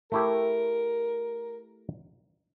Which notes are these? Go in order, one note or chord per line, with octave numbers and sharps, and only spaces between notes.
A3 E4 G4 A#4